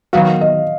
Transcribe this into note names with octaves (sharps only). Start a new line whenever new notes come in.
D#3 F#3 B3 F#4 F5
D#5